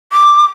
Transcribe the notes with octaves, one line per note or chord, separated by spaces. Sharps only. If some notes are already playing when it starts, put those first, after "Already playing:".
D6